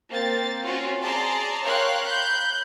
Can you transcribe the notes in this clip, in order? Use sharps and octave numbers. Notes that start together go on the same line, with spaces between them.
A#3 C4 A6
C4 C#4 F4 F#4
G#4 D5 A5 A#5 C6
A#4 C#5 F5 G5 C6 F#6
B5 F#6 G6